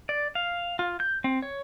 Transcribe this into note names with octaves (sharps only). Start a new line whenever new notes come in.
D5
F5
F4
G6
C4
C#5